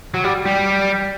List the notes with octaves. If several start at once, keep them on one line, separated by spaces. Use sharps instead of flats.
F#3
G3
G3